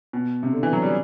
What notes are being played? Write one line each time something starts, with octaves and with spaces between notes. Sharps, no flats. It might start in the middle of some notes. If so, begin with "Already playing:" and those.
B2
C3
D3
E3
F#3
G3